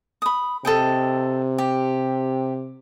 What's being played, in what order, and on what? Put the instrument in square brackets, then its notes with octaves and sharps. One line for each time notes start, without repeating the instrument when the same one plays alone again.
[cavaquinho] B5 D#6
[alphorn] C3 [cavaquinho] A4 D#5 G5
[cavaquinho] G4